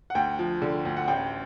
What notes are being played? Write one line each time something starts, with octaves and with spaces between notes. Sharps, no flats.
F#5
D2 G5
F3
D3
D2
F#5
A1 G5